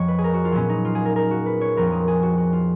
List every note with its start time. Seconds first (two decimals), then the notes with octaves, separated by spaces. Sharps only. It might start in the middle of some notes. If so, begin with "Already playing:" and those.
Already playing: F2 F3 G#3 C#5 D#5
0.08 B4
0.19 G#4
0.24 A#4
0.34 F#4
0.45 F4
0.52 A#2 F#3 B3 C#4
0.69 D#4
0.85 F4
0.95 G#4
1.05 A#4
1.16 A#4
1.31 F#4
1.46 B4
1.61 C#5
1.76 F2 F3 G#3 B3 A#4
1.92 G#4
2.08 G#4
2.22 F#4
2.38 F#4
2.53 F4